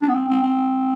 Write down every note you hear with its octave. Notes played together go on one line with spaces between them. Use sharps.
D4
B3
C4
C4
C4